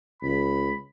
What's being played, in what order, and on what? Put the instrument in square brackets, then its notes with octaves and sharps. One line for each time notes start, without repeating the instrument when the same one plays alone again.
[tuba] C#2 [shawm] B5